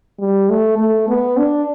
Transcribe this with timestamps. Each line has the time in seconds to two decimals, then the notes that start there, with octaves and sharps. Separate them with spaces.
0.20 G3
0.49 A3
0.78 A3
1.08 B3
1.37 D4